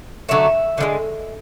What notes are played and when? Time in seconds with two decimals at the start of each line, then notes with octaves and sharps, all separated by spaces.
0.29 D3 F#3 A3 E5
0.78 D3 F3 G#3